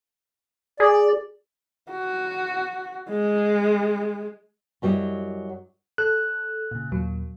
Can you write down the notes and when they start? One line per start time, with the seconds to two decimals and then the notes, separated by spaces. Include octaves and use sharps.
0.80 G#4 D5
1.92 F#4
3.10 G#3
4.82 F#2 F#3 G3 E4 D#5
5.98 A4 F#6
6.71 A#2 C#3
6.92 D#2 A#2 F#3